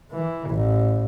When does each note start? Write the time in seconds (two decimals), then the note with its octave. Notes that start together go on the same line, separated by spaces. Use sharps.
0.12 E3
0.50 A1